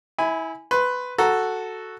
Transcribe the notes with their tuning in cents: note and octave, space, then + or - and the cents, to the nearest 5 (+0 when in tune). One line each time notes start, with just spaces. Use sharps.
E4 -25 G#5 +0 B5 +15
B4 +10 C6 +25
F#4 +0 A4 +0 A#5 +0